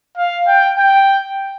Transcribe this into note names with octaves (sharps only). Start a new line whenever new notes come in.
F5
G5
G5